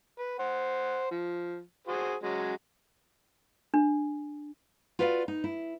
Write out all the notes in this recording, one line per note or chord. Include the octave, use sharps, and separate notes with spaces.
B4
C5 F#5
F3
F#4 G#4 C5
F#3 G#3 C#4
D4
F4 F#4 B4 D5 E5 F5
D#4
E4